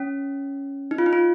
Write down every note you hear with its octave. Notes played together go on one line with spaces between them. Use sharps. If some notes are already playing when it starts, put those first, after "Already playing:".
Already playing: C#4
D#4
F4
D#4
F4